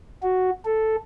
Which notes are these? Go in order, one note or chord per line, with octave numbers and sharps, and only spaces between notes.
F#4
A4